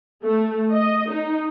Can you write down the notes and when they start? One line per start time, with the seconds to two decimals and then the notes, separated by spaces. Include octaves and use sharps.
0.23 A3
0.71 D#5
1.10 D#4